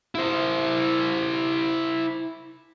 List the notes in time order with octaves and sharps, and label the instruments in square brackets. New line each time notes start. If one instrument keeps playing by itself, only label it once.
[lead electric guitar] E4 C5